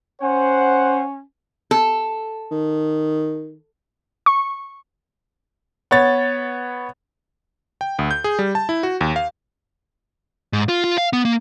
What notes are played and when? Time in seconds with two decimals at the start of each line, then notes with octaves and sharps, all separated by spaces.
0.22 C#4 C5 F#5
1.71 A4
2.51 D#3
4.26 C#6
5.91 B3 C#5 A6
7.81 G5
7.99 D2
8.11 G6
8.24 G#4
8.39 G3
8.55 A5
8.69 E4
8.83 F#4
9.01 D#2
9.16 F5
10.53 G#2
10.69 F4
10.84 F4
10.98 F5
11.13 B3
11.25 A#3